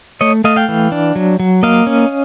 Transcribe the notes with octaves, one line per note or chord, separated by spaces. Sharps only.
A3 C#5 D#5
A3 D#5 F5
F5 G5
E3
D4
F#3
F#3
A#3 D#5 F5
C#4